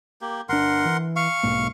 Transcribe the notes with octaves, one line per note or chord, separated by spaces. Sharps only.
A#3 G4
G1 D4 A#4 F#5 C6
E3
F5 C#6
B1 G#2 A#3